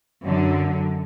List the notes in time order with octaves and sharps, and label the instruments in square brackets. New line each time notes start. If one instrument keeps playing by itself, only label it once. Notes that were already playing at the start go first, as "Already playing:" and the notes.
[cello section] F#2 D3